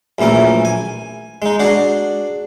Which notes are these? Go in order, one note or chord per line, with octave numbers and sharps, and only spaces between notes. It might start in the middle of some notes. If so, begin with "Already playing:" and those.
A#1 F#2 E3 A3 A#4
G#5
G#3 D#4
D4 F#4 G#4